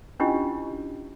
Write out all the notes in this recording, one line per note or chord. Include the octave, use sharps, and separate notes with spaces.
C#4 D4 E4 F4 G4 D#5